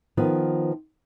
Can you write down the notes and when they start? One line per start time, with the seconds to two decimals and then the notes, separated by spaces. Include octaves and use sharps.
0.17 D#3 F3 B3